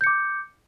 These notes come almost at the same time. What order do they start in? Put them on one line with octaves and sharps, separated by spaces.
G6 C#7 D6